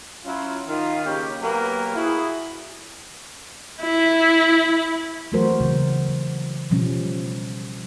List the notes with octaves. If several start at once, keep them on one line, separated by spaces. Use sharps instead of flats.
F#3 C#4 E4 F4
D#3 F4
C#3 A#3 C#4 D#4 G4
B2 F#3 A#3 G4 A#4 B4
E4 F#4 G#4
E4
E3 F#3 A3 F#4 A#4 C5
C#3 E3
F#3
B2 F3 G3 C#4